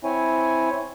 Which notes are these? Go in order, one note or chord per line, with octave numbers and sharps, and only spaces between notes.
C4 E4 C#5 G#5